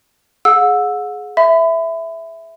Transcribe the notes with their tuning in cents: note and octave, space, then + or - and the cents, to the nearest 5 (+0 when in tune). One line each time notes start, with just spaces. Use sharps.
G#4 +15 F#5 -40 E6 +0
E5 +0 B5 +30